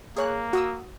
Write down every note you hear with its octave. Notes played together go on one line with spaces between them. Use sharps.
A#3 G#4 C#5 F#6
F#4 D#6 E6